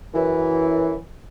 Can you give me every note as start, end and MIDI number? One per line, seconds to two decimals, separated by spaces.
0.15 0.95 42
0.15 0.95 52